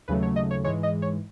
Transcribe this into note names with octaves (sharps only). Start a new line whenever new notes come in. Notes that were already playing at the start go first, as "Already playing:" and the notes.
D#2 C#3 F#3 A3 B4
C#5
D#5
C#5
G#2 E3 G#3 C#5
D#5
C#5